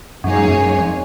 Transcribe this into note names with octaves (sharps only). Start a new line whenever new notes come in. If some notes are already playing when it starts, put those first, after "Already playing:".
F#2 B2 A#3 D#4 G#4 C#5
G#2
F#2
F2